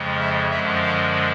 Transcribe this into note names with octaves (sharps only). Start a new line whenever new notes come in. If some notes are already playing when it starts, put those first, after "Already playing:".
Already playing: F2 C#3 F3 G#3
E5
F#2 D3 F3 G#3 E5
F5